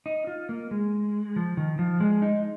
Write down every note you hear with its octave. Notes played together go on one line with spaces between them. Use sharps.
D#4
F4
A#3
G#3
F3
D#3
F3
G#3
D#4